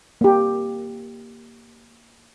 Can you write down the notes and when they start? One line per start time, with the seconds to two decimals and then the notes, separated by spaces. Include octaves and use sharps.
0.21 A#3 G4